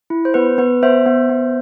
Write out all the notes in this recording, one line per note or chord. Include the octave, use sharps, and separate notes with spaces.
E4
C5
B3 B4
B3 B4
B3 C5 E5
B3
B3